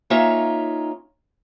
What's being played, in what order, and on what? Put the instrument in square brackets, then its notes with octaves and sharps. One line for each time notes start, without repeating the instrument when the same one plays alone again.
[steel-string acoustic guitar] A#3 C#4 D#4 F4 C#5 E5